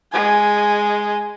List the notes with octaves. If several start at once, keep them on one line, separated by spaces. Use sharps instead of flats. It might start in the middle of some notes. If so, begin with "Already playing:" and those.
G#3 G#5